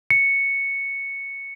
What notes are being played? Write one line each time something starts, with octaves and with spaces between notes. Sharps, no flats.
C#7